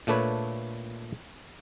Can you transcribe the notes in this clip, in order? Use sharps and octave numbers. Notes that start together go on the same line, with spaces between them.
A#2 A3 D4 A4 B4 C#5